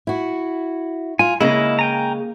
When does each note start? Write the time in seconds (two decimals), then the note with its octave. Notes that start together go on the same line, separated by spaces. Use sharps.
0.07 E4 F#4
1.19 F4 G#5
1.41 C#3 G#3 A#3 E4 D#5
1.79 G5 G#5 A#5